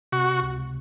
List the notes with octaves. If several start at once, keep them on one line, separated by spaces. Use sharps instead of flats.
C3 F#4
C#2